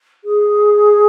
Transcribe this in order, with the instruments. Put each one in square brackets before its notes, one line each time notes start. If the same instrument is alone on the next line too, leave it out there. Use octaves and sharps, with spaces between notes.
[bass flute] G#4